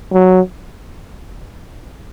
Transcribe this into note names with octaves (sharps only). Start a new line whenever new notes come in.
F#3